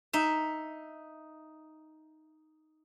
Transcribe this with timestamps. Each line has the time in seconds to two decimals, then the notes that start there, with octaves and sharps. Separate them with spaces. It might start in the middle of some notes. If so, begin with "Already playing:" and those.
0.13 D#4 E5